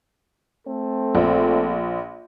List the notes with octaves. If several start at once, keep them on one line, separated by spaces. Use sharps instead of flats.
A3 C4 A4
A#1